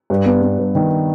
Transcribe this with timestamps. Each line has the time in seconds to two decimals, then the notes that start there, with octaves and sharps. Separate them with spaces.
0.10 G2
0.26 B3
0.42 B3
0.59 G2
0.75 D#3